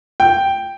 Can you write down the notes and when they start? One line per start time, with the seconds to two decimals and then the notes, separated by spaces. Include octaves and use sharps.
0.20 G5